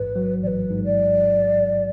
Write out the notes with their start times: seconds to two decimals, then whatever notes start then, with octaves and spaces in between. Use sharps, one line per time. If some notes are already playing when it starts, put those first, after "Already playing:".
Already playing: A1 G#2 B4
0.16 F#3
0.42 A1 D5
0.47 B4
0.70 G#2
0.85 D5